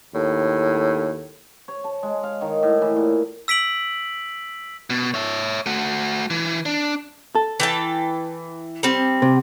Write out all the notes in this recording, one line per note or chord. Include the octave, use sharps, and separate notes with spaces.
D#2 A2
C#5
A5
G#3
F5
D#3
A2
E3
A#2
E6 B6 D7 F#7
B2
C#5 E5
A3 F#4
E3
D4
A4
E3 G5 A5
G3 C4
C3